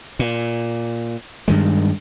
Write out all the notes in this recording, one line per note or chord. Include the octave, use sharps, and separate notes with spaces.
A#2
G2 D#3 G#3